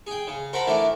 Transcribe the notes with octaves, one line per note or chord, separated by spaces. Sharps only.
G#4 G5
C#3
A#4 C5 F#5 A5 B5
E3 A3 D4 A#4